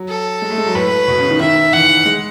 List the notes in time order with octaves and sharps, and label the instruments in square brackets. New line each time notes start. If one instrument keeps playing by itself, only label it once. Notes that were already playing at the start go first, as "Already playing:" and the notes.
Already playing: [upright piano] F#3
[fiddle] A4
[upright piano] G#3
A3
G#3
F#3
[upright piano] A2 [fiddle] B4
[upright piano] B2
C#3
D#3
[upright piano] D#3 [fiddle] E5
[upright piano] E3 [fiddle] F#5
[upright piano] G#3